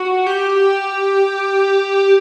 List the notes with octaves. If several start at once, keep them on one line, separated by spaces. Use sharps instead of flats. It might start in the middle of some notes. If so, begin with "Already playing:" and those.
Already playing: F#4
G4